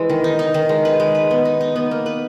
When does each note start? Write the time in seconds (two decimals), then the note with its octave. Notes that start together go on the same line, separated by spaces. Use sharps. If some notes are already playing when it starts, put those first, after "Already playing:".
Already playing: E3 G#3
0.10 D#3
0.24 D#4
0.39 D#4
0.54 D#3
0.69 G#3
0.85 B4
1.00 G#3
1.15 B4
1.31 B3
1.45 D#4
1.61 D#4
1.76 B3
1.91 A#3
2.06 B4